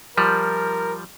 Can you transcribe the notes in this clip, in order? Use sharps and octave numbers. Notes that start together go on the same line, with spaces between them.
F3 G3 A#4